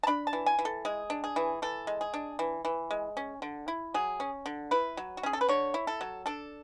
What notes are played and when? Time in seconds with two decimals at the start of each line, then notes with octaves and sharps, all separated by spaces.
0.03 A5
0.07 D4 B5
0.27 A5
0.33 E3
0.46 G#5
0.59 E3
0.65 A4
0.85 G#3 G#4
1.10 D4
1.24 G#4
1.36 E3
1.62 E3 A4
1.87 G#3
2.01 G#4
2.14 D4
2.39 E3
2.65 E3
2.91 G#3
3.17 C#4
3.42 D3
3.68 E4
3.94 F#3 G#4
4.20 C#4
4.46 D3
4.71 E4 B4
4.97 F#3
5.17 F#4
5.23 C#4 G#4
5.33 A4
5.41 B4
5.49 D3 C#5
5.74 E4
5.87 A4
6.01 F#3
6.26 D4 A4